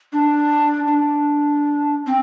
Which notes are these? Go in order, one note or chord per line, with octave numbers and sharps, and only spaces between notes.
D4
D4
C4